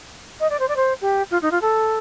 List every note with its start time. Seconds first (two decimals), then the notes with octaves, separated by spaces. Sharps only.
0.40 D#5
0.50 D5
0.59 C5
0.68 D5
0.76 C5
1.01 G4
1.30 F4
1.42 D#4
1.51 F4
1.61 A4